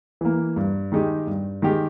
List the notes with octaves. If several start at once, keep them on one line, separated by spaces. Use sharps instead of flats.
E3 A#3
G2
D#3 G#3 D#4 G4
G2
D#3 G#3 D#4 G4